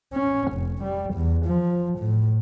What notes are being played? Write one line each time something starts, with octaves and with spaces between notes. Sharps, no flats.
C#4
F1
G3
E2
F3
A2